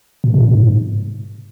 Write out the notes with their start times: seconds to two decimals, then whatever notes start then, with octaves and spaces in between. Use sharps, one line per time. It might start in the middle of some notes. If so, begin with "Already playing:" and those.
0.24 A#2
0.34 C3
0.45 A#2
0.54 G#2